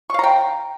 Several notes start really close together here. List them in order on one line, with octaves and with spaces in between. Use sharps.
C#6 F5 A#5 G5